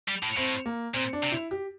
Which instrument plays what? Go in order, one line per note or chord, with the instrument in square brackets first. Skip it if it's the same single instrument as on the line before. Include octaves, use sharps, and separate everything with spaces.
[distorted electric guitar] G3
A2
[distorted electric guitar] A2 [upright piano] C4
[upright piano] A#3
[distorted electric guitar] A#2 [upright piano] C4
[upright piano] D4
[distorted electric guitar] C3
[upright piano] E4
G4